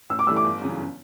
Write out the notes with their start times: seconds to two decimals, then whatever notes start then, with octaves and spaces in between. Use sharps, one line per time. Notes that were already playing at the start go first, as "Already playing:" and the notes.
0.10 A1 E6
0.19 D6
0.27 G2 E3 A3 E4 E6
0.36 D6
0.45 G1
0.61 F#2 C#3 E3